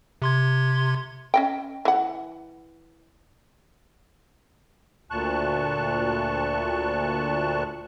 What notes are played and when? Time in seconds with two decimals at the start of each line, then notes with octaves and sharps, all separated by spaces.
0.22 C3 C6 G#6
1.34 C#4 D#5 G5
1.85 E3 F#5
5.11 D2 A#2 A5 C#6 F#6